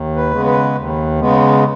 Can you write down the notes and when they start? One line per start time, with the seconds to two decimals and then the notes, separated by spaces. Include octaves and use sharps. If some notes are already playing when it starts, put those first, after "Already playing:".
Already playing: D#2
0.16 B4
0.31 C#3 G#3 B3
0.46 B4
0.75 D#2
1.20 C#3 G#3 B3